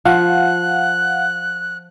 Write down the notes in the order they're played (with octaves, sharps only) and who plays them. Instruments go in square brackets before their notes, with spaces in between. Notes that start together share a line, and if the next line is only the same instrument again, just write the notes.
[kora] F3 [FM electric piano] F5 F#5 [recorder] F#6